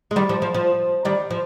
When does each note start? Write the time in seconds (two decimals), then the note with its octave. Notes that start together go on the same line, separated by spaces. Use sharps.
0.11 G#3
0.16 D#3 G3
0.29 F3
0.42 F3
0.54 F3
1.05 D#3 G3
1.31 F3